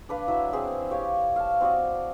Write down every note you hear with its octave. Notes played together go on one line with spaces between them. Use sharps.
D4 B4 F5
F#3 E4 E5
C4 G#4
G4 C#5 F5
F5 A5
C4 F#4 D5 D#5